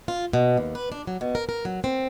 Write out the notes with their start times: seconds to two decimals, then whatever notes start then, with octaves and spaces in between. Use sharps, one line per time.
0.08 F4
0.33 B2
0.57 D#2
0.75 B4
0.92 D4
1.07 F#3
1.21 B2
1.35 A#4
1.49 A#4
1.65 F#3
1.84 C4